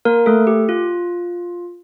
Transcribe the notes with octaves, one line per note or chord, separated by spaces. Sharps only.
A#3 A#4
A3 A4
G4
F4